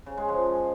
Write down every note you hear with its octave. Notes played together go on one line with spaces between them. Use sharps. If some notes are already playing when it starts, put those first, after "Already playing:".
C#3
G#3
F3